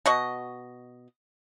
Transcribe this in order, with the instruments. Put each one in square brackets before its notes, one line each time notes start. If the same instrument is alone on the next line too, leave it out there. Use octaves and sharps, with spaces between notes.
[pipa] B2 F#4 D#5